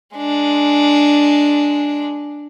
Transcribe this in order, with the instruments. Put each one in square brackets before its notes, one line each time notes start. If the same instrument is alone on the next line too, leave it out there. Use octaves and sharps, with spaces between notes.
[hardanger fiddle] G#3 D4